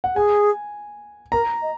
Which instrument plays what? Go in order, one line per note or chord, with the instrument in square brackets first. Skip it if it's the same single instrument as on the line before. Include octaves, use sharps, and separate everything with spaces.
[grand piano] F#5
[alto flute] G#4 [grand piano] G#5
[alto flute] A#4 [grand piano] A#5
[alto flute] D#5